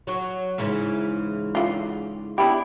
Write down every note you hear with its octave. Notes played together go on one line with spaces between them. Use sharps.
F#3 F#4
G#2 C#3 E3
D3 E4 F4
B3 D4 E4 G4